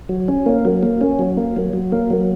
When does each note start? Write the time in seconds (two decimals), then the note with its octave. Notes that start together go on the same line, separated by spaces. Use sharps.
0.09 F#3
0.28 C#4
0.46 A#3
0.65 F#3
0.83 A#3
1.01 C#4
1.19 F#3
1.37 A#3
1.56 F#3
1.73 F#3
1.92 A#3
2.10 F#3